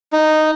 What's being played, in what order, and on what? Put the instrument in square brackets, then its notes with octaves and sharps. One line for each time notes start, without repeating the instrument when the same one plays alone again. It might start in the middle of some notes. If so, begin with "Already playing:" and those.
[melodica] D#4